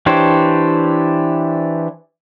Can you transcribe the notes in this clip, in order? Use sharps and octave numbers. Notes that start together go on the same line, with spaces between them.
E3 D4 G4 C5 C#5